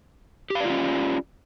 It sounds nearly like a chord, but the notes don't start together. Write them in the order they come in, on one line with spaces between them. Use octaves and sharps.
G4 F5 D5 F4 C#4